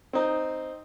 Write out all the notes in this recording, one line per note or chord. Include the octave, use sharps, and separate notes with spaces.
C4 D#4